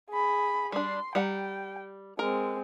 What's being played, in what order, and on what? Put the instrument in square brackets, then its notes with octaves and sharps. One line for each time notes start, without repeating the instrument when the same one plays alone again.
[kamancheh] G#4 B5
[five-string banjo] G3 D4 [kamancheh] C6
[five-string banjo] G3 F#5 A#5 [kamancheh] G5
[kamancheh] G#3 C4 [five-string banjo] A#4